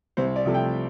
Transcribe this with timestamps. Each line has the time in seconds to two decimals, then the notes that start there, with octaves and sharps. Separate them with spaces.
0.17 C2 C5
0.36 D5
0.46 C3 F3 A3
0.54 G5